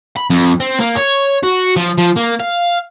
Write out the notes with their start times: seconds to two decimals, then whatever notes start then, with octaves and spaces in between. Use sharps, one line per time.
0.17 B5
0.30 F2
0.60 C4
0.80 A#3
0.97 C#5
1.43 F#4
1.76 F3
1.98 F3
2.16 A#3
2.40 F5